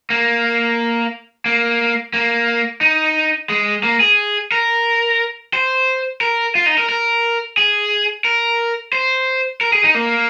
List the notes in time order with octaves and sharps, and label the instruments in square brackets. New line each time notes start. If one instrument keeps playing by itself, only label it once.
[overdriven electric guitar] A#3
A#3
A#3
D#4
G#3
A#3
G#4
A#4
C5
A#4
F4
D#4
A#4
A#4
G#4
A#4
C5
A#4
G#4
D#4
A#3